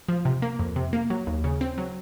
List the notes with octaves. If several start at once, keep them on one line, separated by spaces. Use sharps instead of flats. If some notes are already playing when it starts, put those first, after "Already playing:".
F3
C3
A#3
F2
C3
A#3
F#3
D#2
C#3
C4
F#3